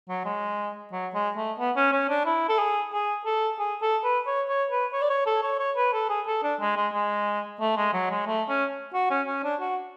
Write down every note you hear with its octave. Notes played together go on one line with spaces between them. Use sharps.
F#3
G#3
F#3
G#3
A3
B3
C#4
C#4
D4
E4
A4
G#4
G#4
A4
G#4
A4
B4
C#5
C#5
B4
C#5
D5
C#5
A4
C#5
C#5
B4
A4
G#4
A4
D4
G#3
G#3
G#3
A3
G#3
F#3
G#3
A3
C#4
F#4
C#4
C#4
D4
F#4